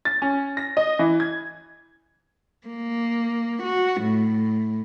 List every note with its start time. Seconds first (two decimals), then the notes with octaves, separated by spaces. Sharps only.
0.05 A6
0.22 C#4
0.57 A#6
0.77 D#5
0.99 E3
1.20 G#6
2.67 A#3
3.63 F#4
4.02 A2